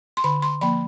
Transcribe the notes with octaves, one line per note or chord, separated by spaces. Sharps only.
C6
D3 B5
C6
F3 A#3 B5